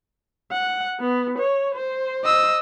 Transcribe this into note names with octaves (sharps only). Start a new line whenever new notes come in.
F#5
B3
C#5
C5
D#5 E6